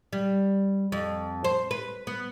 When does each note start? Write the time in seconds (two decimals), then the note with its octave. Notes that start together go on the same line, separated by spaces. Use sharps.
0.13 G3
0.92 F2
1.44 C5
1.71 B4
2.07 B3